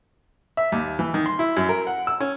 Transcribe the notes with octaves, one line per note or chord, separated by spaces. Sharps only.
E5
D#2
E3
D#3
C6
E4
F#2
A#4
F#5
E6
C#4